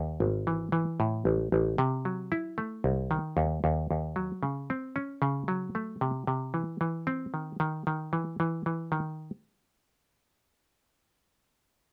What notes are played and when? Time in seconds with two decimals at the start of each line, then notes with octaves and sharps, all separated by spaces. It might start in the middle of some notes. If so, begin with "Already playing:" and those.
Already playing: D#2
0.20 G#1
0.47 E3
0.72 E3
1.00 A2
1.25 A1
1.52 A1
1.78 C3
2.05 F#3
2.32 E4
2.58 A3
2.84 C2
3.11 D#3
3.37 D#2
3.64 D#2
3.91 D#2
4.16 F#3
4.43 C#3
4.70 C4
4.96 C#4
5.22 C#3
5.48 F#3
5.75 A3
6.01 C3
6.27 C3
6.54 E3
6.81 E3
7.07 C4
7.34 D#3
7.60 D#3
7.87 D#3
8.13 E3
8.40 E3
8.66 E3
8.92 D#3